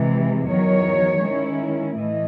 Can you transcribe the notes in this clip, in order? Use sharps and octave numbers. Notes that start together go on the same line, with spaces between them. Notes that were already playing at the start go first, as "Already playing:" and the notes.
Already playing: C3 E3 G#3
E2 D#3 F#3 C#5
D#3 G#3 C#4 E4
A2 E3 A3 D#5